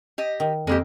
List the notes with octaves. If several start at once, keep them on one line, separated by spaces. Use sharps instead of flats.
G4 D#5
D#3
F2 G#3 A#3 G4